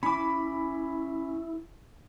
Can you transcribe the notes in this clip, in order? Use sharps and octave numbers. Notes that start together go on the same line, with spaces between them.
C#4 E4 B5 D6